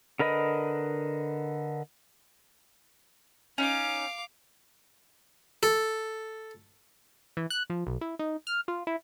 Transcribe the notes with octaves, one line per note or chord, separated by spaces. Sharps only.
D3 A#4 B4 D#5
C#4 D#4 F5 D6
A4
E3
F#6
F3
B1
E4
D#4
F6
F4
E4